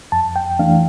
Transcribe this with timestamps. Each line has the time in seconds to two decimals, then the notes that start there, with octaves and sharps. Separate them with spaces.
0.12 F2 A5
0.36 G5
0.59 E3 A3 D4 F5